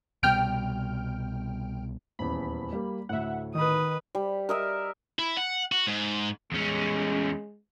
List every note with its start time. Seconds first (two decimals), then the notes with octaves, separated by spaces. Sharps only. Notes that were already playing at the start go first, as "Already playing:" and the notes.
0.23 C2 B2 G3 G5 F6 D7
2.19 D#1 E2 B5
2.73 G3 A#3
3.09 D2 A2 E5 F#5
3.55 D#3 B4 D#6
4.15 G3
4.49 A#4 D#5 E5
5.19 E4
5.37 F#5
5.72 F#4
5.87 G#2
6.52 E2 G#3 C#4